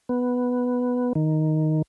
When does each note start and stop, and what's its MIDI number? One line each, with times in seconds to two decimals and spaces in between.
0.09 1.13 59
1.15 1.82 51